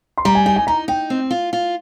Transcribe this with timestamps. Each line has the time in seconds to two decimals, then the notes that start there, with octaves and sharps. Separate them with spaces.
0.18 C6
0.25 G3 A#5
0.35 G#5
0.46 D#4 G#5
0.56 G#5
0.67 D#4 A#5
0.88 D#4 G5
1.10 C4
1.31 F4
1.53 F4